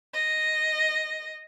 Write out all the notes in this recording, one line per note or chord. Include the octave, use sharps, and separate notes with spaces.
D#5